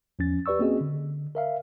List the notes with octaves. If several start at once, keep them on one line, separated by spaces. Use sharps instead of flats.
E2 F3 C#4 A6
G4 B4 D5 C#6 E6
A#3 C4 C#4 F#4 G#4 D#5
D3
A#4 E5 F5